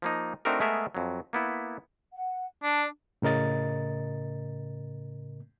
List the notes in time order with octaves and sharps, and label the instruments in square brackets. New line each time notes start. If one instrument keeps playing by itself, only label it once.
[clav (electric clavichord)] F3 A#3 D#4
A3 C4 D4 D#4 F#4 A#4
G#3 A3 B3 G#4 A#4 E5
F2 F#3
A#3 B3 E4
[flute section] F#5
[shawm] D4 [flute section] D5 A5
[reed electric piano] A2 C#3 A#4 D#5 A6